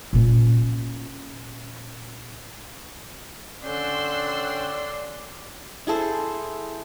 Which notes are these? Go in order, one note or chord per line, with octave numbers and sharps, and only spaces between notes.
A#2 C#4
D3 C#4 D5 G5 C6 E6 F#6
E4 G#4 A4 C5